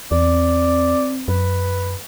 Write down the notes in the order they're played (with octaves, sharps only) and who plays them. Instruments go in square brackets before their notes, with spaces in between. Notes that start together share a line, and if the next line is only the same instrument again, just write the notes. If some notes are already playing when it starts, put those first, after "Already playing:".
[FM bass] E2 [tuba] C4 [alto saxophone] D5
[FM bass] F#2 [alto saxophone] B4